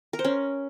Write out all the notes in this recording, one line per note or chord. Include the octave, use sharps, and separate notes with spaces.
A#4
C5
C#4